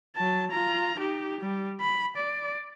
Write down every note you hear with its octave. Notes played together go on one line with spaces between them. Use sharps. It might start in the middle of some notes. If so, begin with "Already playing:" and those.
F#3 A5
F4 A#5
D#4 G4
G3
B5
D5